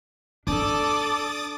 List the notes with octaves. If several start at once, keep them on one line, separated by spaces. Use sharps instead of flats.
D4 A4 D5 D6 D#6 A6